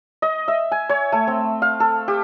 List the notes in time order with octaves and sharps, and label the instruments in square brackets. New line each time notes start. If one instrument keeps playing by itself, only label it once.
[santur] D#5
E5
G#5
C#5
A3
C4
F5
A4
G4